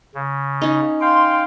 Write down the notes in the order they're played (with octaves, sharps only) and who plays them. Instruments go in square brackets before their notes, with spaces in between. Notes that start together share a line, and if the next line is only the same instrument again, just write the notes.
[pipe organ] C#3
[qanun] C#4 D#4
[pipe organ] F5 G5 [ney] C6